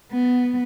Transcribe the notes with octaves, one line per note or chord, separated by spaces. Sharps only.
B3